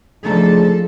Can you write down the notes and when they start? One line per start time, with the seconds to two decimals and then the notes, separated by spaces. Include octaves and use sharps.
0.25 C#3 F3 A3 D4 D#4 G#4 A4 A#5